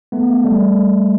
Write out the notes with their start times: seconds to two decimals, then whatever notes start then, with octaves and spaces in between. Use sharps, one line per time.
0.12 A3 B3
0.44 G3 A3